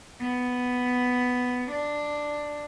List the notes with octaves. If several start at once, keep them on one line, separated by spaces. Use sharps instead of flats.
B3
D4